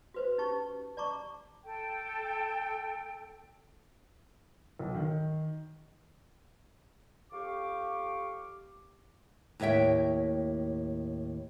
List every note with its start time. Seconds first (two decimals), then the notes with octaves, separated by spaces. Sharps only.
0.14 F#4 B4 C5
0.38 C#4 D#4 G4 A5 C#6
0.97 D5 A5 A#5 C#6 D6
1.64 A4 G5
4.79 B1
4.95 D#3
7.32 F2 G4 F5 C#6 D6
9.60 D#2 A2 C#5 E5 G5